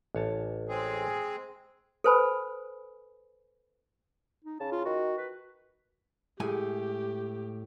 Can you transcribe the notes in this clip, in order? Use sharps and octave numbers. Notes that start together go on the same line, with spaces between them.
A1 C#5 A5
G#3 C4 G#4
A4 B4 C5 G#5 B5
D#4
C#3 A5
F4
D#3 F#4
B4
A2 G#3 G4 G#5